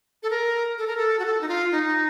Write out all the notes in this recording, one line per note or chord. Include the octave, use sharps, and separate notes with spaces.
A4
A#4
A4
A#4
A4
F#4
A4
D#4
F4
D#4